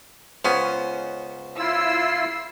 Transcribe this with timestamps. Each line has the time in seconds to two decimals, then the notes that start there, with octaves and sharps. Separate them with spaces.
0.45 C#2 B3 C#4 C5
1.58 E4 F4 E6 C7